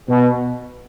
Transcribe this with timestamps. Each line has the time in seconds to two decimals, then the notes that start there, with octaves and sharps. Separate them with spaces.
0.09 B2